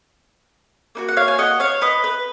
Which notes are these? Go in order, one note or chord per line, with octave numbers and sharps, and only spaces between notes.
A#3 D#4 F#4
F#5
C#5 F5
G#5
D#5 F#5
C#5 F5
B4 D#5
B4